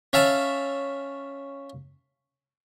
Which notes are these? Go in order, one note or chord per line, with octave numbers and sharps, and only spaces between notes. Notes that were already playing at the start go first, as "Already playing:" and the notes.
C#4 E5 F5 A5